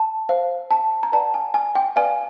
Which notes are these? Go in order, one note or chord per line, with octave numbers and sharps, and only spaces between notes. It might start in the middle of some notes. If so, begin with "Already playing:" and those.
Already playing: A5
C5 F5
A5
A#5
B4 D5 F#5 A5
G#5
G#5
G5
B4 D5 F5 G#5